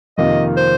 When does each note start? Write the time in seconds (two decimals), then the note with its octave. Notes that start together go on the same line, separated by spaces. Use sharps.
0.18 F2 C3 D#3 A#3 F4 D#5
0.57 C5